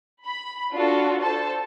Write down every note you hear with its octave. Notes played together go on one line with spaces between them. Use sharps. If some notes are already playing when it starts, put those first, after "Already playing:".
B5
D4 F4 F#4 A4
A4 C5 A5